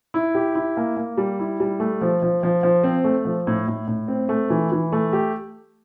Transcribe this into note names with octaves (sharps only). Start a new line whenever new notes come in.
E4
G4
E4
A#3
A#3
G3
E4
G3
A3
F3
F3
F3
F3
C4
A3
F3
A2
A2
A2
C4
A3
E3
E3
A3
G4